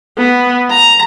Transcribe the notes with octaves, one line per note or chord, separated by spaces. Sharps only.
B3
A#5